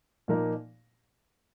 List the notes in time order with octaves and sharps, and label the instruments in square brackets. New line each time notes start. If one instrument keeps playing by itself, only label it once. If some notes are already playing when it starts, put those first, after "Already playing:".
[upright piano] A#2 F3 A#3 D#4 A#4